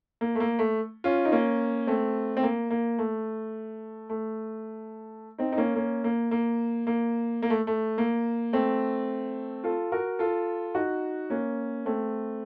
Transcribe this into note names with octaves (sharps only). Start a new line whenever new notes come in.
A#3
A3
A#3
A3
C#4 F4
D#4
A#3 C#4
A3 C4
C4
A#3
A#3
A3
A3
C4 D#4
D#4
A#3 C#4
A#3 C#4
A#3
A#3
A#3
A#3
A3
A3
A#3
A3 C4
F4 A4
F#4 A#4
F4 A4
D#4 F#4
A#3 C#4
A3 C4